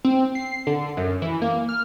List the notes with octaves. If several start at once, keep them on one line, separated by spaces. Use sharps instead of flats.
C4
C7
D3
F#2
E3
A#3
F6